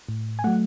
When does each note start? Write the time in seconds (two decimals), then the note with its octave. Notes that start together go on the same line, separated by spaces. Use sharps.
0.09 A2
0.39 G#5
0.44 F#3 A3 F#5